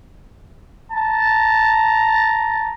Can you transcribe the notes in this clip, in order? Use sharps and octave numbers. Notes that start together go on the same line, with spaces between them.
A5 A#5